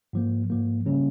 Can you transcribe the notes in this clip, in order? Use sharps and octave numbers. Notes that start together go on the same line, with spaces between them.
G#2 F3 A#3
G#2 F3 A#3
C#3 G3 A#3 C#4